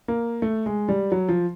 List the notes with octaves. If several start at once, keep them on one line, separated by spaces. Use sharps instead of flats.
A#3
A3
G#3
G3
F#3
F3